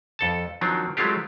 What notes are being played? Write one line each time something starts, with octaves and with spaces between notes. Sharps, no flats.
F2 A4 A5
D#3 F3 F#3 C4 D4
F#3 G#3 A3 C4 F4 G4